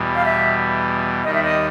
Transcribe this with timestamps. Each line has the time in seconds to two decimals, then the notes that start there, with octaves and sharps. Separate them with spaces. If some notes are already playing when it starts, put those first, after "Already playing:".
Already playing: E2 B2 G3
0.15 F5
0.25 E5
1.24 D#2 D#3 G3 D#5
1.34 E5
1.43 D#5